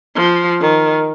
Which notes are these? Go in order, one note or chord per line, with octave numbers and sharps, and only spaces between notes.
F3
D#3